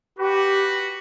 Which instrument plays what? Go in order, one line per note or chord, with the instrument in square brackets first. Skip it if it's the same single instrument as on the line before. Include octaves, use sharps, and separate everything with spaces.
[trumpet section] F#4 B4 [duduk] G4